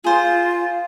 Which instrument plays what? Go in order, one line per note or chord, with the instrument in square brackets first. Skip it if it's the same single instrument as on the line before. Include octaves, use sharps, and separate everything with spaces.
[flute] F4 [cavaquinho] G#4 C5